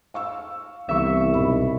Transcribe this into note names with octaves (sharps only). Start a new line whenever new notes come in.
F5 C#6 E6
C2 E3 B3 E5 C#6
B1 B5